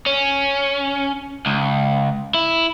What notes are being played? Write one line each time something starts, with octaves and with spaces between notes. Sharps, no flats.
C#4
C#2
E4